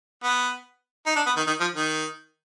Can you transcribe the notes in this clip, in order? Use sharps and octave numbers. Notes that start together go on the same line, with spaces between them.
B3
D#4
D4
B3
D#3
D#3
F3
D#3